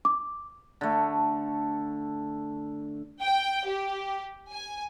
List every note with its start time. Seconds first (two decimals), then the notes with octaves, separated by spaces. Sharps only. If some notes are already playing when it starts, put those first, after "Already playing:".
0.05 D6
0.81 D3 A3
3.23 G5
3.67 G4
4.53 G#5